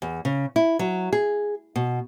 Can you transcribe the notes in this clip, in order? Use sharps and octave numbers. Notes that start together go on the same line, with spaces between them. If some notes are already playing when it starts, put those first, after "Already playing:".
E2
C#3
E4
F#3
G#4
B2